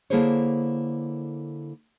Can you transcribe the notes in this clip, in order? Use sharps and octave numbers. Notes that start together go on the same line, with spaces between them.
D3 A#3 E4 G#4 C5 C#5